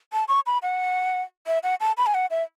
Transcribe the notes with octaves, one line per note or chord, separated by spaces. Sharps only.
A5
C#6
B5
F#5
E5
F#5
A5
B5
G#5
F#5
E5